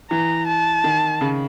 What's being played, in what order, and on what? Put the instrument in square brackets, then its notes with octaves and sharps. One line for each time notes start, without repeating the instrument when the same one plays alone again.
[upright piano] E3 [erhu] A#5
[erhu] A5
[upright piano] D#3
C#3